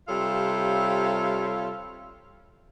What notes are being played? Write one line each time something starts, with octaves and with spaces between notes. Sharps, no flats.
C3 G3 F4 A4 C#5 F5